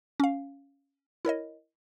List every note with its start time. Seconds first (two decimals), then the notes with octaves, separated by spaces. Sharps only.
0.20 C#4 F5
1.25 E4 A#4 C#5 D#5